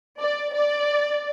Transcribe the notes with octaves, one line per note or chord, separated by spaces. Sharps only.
D5
D5